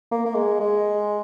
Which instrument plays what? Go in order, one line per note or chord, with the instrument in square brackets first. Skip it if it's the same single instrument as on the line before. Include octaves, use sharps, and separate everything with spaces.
[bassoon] A#3
A#3
G#3
G#3